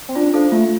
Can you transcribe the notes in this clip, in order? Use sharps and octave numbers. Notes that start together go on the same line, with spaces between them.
C4
D4 F4
D4 A4 C5 F5
A3 F4